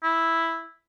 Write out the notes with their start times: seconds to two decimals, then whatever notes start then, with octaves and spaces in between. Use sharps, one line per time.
0.03 E4